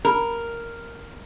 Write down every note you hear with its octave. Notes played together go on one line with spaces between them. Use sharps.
A#4